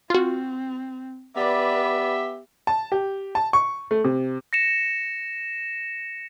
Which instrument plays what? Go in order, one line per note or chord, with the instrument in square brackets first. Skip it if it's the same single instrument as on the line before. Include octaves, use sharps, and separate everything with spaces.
[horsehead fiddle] C4 [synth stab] F4 F#4
[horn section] B3 G4 E5 [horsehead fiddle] B4 D5
[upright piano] A5
G4
A5
C#6
A3
C3
[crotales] A#6 C#7 E7